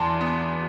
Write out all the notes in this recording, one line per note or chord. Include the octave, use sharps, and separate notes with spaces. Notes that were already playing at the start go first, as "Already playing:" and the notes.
Already playing: E2 A5 C6
B3